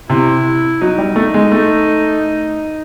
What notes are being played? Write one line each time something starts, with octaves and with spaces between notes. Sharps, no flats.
C3 E4
F#3 D#4
G3
A3
G#3
A3